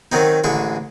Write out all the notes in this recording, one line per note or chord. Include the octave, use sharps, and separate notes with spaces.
D#3 F#3 C4 D#4
A1 D3 G#3 C#6